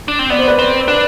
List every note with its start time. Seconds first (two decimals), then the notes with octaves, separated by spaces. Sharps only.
0.08 D4
0.19 C4
0.30 B3 D5
0.39 C5
0.48 B4 D5
0.59 C4
0.87 D4 B4 D5